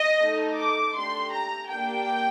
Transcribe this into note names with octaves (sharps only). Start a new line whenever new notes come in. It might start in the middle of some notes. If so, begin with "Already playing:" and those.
Already playing: D#5
A3 D#4 A4
D6
A3 D4 G4 C6
A#5
A#3 D4 G4 G5